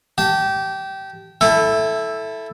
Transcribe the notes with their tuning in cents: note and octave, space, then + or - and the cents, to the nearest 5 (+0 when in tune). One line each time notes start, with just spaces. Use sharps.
G4 -20 A5 +0
E4 +0 A4 +0 G5 +45